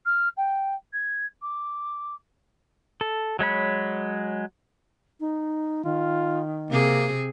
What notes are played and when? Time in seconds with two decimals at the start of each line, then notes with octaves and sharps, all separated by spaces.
0.05 F6
0.37 G5
0.93 G#6
1.42 D6
3.01 A4
3.39 F#3 G#3 C#5 B5
5.20 D#4
5.85 D#3 F4
6.71 C3 A#3 C4 G#4